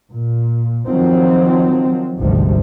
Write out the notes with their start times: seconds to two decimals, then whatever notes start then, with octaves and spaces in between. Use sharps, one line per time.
0.13 A#2
0.87 D#3 F3 F#3 C4
2.20 G#1 D2 G2 C3 F3 G3